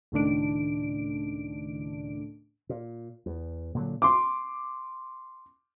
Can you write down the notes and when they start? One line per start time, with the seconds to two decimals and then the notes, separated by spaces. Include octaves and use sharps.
0.12 C#2 A2 D#3 D4 D7
2.69 A#2
3.26 E2
3.75 A#2 D3 F#3
4.02 C6 D6